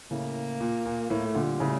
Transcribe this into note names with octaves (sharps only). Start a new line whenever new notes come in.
A2 C#3 A#3
A#2
A#2
A2 A#3
A3
A#2 D3
G3
A2 C#3